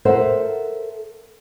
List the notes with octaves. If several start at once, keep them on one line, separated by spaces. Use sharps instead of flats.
A4 A#4 C5 E5 F#5